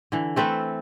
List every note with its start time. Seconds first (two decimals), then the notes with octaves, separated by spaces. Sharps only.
0.12 D3 E3
0.36 A3 C4 A4 B4